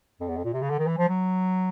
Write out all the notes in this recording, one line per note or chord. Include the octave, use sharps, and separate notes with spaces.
F2
E2
F2
A#2
C3
C#3
D3
D#3
E3
F3
F#3